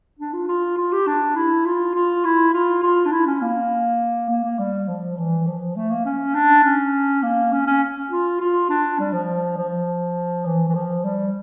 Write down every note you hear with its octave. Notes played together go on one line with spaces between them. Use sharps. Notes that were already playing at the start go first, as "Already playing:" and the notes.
D4
F4
F4
F4
G4
D4
E4
F4
F4
E4
F4
F4
D4
E4
C#4
A#3
A#3
A#3
G3
F3
E3
F3
A3
A#3
C#4
D4
C#4
A#3
C#4
C#4
F4
F4
D4
G3
F3
F3
E3
E3
F3
G3